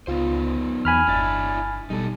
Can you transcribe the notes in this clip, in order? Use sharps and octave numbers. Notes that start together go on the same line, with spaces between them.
C#2 B3 D#4 F4 C5
E2 G#5 B5 F6
G1 D4 E4 A6
B2 G3 D#4 A4